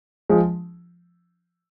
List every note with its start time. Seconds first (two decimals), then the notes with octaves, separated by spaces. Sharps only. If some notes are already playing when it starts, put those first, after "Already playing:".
0.29 F3 G#3